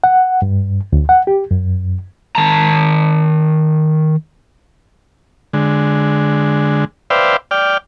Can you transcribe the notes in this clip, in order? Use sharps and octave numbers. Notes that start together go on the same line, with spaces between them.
F#5
G2
D2
F#5
G4
F#2
D#3 A5 A#5
D3 G#3
B4 C5 D5 E5 F5 G5
D5 G5 F6